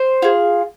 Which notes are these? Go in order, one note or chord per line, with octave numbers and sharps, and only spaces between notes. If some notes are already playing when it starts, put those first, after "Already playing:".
Already playing: C5
F4 G#4